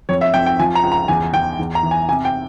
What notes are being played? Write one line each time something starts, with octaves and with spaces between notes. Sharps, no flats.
F2 C#5
E5
F2 G5
G5
F3 G#5
A#5
C#2
A#5
E2 G#5
E2 G5
E2
A#5
E3
G#5
C3 G#5
G5